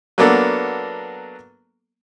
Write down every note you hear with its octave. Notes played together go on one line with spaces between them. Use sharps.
F#3 A#3 B3 D4 A4